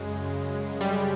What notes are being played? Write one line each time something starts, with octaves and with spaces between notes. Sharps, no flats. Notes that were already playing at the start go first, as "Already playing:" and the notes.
Already playing: F#2 C#3 G#3
G3